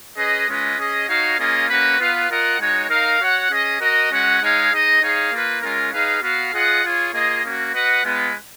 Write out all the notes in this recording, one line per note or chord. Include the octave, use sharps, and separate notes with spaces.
C#4 G#4 B4 D#5
G#3 C#4 F4 B4 D#5
C#4 G#4 D#5
D#4 F#4 C#5 F5
A#3 C#4 F4 G#4 D#5
A#3 C#4 F#4 B4
B3 F4 B4 F5
F4 A#4 D#5 F#5
G#3 D#4 F#4 C#5
D#4 A#4 F5
F#4 C#5 F#5
C#4 G#4 D#5
F#4 A#4 D#5
G#3 C#4 F#4 C#5 F#5
G#3 D#4 G#4 C#5 F5
D#4 G#4 D#5
D#4 G#4 C#5 F5
A#3 F4 B4
G#3 C#4 F4 A#4
D#4 G#4 B4 F5
B3 F#4 B4 F5
F4 G#4 D#5 F#5
F4 G#4 C#5
A#3 F4 G#4 D#5
A#3 C#4 F#4
F#4 B4 D#5 F#5
G#3 B3 F4 B4